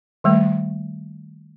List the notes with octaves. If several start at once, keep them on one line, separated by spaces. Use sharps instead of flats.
D#3 G3 A3